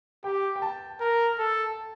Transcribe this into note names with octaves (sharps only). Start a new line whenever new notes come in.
G4 G5
G5
A5
A#4
A4